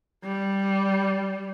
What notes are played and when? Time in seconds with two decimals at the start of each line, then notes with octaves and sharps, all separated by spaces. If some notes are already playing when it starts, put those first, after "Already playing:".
0.24 G3